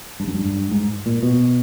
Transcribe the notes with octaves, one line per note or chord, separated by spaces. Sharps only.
G2
F#2
G2
G2
G#2
A#2
B2